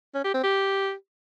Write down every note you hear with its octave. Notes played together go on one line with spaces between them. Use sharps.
C#4
G4
C4
G4